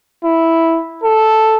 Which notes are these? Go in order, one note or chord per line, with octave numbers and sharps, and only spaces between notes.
E4
A4